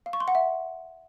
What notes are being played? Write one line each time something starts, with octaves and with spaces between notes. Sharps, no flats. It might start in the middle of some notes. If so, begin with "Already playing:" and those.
F5
C#6
C6
F#5
E5